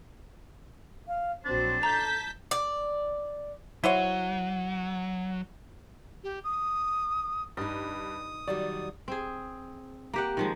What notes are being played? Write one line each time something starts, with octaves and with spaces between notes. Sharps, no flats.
F5
A#1 F#3 C4 D4 C5
A4 A5 A#5 G6 B6
D5
F#3 E4 C5 C#5 F#5 D#7 G7
G4
D#6
G2 D#4 D#5 D#6
D#3 F#3 G3 D5
C4 G#4
A#3 G4 F#5
D#3 F3 G#3